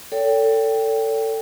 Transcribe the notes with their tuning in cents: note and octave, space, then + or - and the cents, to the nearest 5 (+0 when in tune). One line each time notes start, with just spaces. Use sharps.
A4 +20 C#5 +40 G5 +0